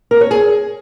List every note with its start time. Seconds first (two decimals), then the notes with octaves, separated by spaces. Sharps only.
0.11 A#4
0.21 C#5
0.31 G#4